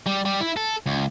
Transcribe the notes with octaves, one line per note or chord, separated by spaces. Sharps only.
G3
G3
E4
A4
C#2